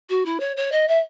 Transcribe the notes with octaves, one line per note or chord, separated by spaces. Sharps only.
F#4
E4
C#5
C#5
D#5
E5